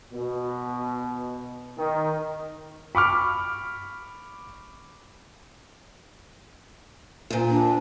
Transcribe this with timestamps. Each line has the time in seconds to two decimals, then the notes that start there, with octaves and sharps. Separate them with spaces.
0.13 B2
1.78 D#3
2.95 B5 C#6 D6 F6
7.30 D2 A#2
7.50 D4